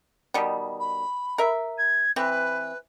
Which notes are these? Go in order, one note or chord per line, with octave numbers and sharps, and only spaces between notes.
B2 D#3 G3
B5
A#4 E5
G#6
E3 C4 B4